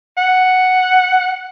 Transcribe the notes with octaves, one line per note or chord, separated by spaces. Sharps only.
F#5